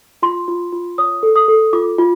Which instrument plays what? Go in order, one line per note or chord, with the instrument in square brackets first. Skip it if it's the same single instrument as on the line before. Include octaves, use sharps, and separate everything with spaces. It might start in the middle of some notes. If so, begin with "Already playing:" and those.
[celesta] F4 C6
F4
F4
C#5 D#6
A4
D#6
A4
F4 D6
F4